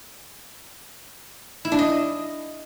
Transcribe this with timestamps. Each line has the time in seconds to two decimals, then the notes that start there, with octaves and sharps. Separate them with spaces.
1.65 E4
1.72 D4
1.79 D#5